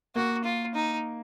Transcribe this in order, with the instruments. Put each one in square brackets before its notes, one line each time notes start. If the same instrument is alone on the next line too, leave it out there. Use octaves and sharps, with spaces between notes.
[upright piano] A#3 [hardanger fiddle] F#4
[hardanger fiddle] F4
D#4